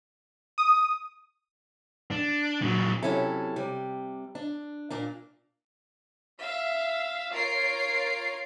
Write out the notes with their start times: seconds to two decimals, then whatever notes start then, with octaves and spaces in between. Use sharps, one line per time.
0.58 D#6
2.11 D4
2.62 A#2 F#3
3.03 C3 F#3 C#4 E4 A4
3.56 C3 G3
4.35 D4
4.91 A#2 A#3 D4
6.39 E5 F5
7.31 F4 A#4 C#5 C7 D7